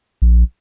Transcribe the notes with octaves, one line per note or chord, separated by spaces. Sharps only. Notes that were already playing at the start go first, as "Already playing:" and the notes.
A#1